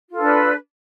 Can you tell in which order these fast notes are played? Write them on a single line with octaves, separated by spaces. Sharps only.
F4 A4 D4 B4